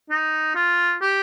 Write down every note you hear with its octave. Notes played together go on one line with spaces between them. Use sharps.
D#4
F4
G4